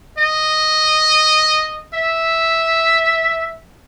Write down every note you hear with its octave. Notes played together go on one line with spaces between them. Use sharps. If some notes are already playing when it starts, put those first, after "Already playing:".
D#5
E5